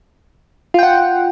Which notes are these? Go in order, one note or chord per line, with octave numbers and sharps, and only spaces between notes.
F4 F#5 G5